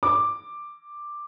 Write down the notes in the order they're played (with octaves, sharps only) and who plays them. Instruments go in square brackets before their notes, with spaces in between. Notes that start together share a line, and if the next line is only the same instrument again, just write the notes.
[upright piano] D6